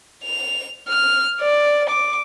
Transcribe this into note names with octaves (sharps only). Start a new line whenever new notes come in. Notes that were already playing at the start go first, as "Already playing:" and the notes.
F7
F6
D5
D6